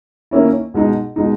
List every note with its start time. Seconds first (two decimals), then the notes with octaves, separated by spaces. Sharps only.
0.31 D#3 A#3 C#4 E4
0.74 B2 G#3 D#4
1.16 B2 G#3 D#4